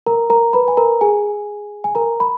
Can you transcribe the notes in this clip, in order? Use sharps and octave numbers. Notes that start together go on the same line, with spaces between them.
A#4 A#5
A#4 A#5
B4 B5
G#5
A#4 A#5
G#4 G#5
G#5
A#4 A#5
B5